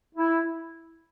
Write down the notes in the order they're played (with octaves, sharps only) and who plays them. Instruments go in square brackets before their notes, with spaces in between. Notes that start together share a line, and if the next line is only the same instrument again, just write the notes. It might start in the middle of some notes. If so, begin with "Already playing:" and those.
[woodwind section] E4